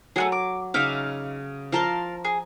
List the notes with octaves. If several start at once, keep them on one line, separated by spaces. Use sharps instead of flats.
F#3 A3 B3 G#4
D6
C#3 D#4 E5 F5 D6
F3 A#4 F5 A5 C6
G#4